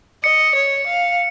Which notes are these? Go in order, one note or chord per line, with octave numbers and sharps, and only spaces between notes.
D#5 C#7
C#5
F5